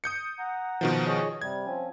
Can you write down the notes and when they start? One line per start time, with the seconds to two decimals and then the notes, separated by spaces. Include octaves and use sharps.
0.04 D#6 G6 C#7
0.39 F#5 A#5
0.81 B2 D#3 F3
1.06 G#4 C#5 D#5
1.41 C3 G3 G#6
1.66 F3 C4 C#4